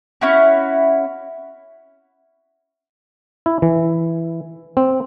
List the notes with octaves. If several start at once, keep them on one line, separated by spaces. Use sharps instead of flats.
C#4 E4 F#4
E4
E3
C4